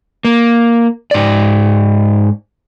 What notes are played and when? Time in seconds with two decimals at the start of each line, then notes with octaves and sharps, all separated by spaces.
0.25 A#3
1.11 G#2 D5